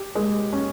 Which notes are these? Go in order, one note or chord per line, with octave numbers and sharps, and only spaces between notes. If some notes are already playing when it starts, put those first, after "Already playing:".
Already playing: G4
G#3
C#4